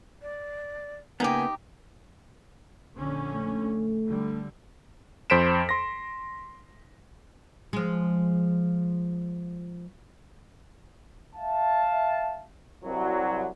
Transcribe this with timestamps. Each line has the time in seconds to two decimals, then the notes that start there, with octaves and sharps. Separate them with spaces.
0.22 D5
1.20 C#3 A#3 B3 D#4 G4 G#5
2.94 A#1 D3 C#4
3.35 A3
4.06 D3 G3
5.30 F2 C5 B6 D7 E7
5.69 C6 A#6
7.73 F3 G#3
11.36 E5 F5 A5
12.85 C2 F#3